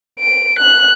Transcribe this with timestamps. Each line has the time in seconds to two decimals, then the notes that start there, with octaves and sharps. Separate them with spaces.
0.20 D7
0.59 F#6